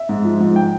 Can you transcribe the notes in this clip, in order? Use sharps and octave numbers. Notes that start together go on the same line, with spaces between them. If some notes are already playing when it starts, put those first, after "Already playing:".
Already playing: E5
G#2
F3
G#2
G5